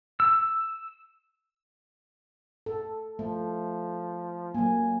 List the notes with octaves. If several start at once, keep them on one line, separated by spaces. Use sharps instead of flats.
E6
A4
F3 A3
F#3 A#3 G#5